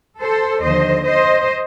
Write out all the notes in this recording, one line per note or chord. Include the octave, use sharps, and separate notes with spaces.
A4 C5
D#2 D3 F3 C5 D#5
C5 D#5